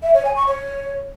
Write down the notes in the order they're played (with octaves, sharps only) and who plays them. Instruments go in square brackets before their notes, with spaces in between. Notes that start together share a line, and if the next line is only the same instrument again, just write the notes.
[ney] E5
C#5
G#5
C#6
C#5